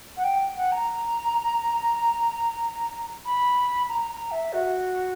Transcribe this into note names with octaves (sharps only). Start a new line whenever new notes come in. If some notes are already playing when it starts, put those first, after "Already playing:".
F#5
G5
F#5
A#5
B5
A#5
A#5
E5
F#4